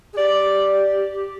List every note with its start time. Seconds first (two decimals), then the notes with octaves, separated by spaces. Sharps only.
0.13 G#4
0.17 G4 D5